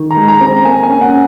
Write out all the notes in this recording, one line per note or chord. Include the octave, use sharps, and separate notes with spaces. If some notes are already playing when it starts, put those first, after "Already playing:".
Already playing: D#3
A#5
G#3
A#5
C4
A#5
A#3 G#5
G#5
C#4
F#5